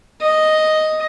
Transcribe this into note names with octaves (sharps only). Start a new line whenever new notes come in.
D#5